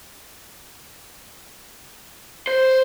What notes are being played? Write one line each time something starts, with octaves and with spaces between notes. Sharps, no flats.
C5